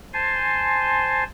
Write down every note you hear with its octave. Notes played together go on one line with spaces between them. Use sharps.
C5 G#5 A5 C6